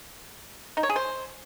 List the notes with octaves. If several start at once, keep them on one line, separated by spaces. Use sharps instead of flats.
D#4
C#5
G#4
C5